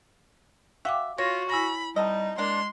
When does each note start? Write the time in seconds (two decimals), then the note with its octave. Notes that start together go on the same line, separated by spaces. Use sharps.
0.85 F#4 E5 F5 G5 D6
1.18 F4 F#4 C#5 A#6
1.50 E4 G#5 B5 A#6
1.96 C3 G3 D#4 A4 D#5
2.38 G#3 A#3 D4 C6